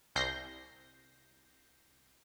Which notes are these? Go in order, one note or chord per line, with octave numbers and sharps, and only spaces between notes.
C2 G6 A#6 C7